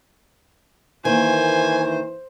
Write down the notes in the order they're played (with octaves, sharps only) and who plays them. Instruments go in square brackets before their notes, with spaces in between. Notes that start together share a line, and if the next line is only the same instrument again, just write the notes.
[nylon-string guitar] D#3 A#3 [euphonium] E3 [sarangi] C5 [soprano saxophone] G#5